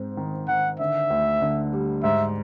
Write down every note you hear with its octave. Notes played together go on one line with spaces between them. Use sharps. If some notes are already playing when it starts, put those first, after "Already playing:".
Already playing: G#2 C4
D#3
D#3 F#5
D3 E5
D2
D3
G3
G#2 E5